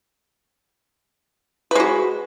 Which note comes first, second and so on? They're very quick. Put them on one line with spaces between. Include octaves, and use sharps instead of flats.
B4 G#3 F#4